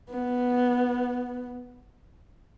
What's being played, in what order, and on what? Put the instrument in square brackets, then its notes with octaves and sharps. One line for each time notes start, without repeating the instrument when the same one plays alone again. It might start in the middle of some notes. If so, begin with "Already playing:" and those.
[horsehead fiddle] B3